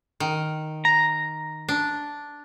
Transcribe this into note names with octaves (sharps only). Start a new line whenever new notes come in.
D#3
A#5
D4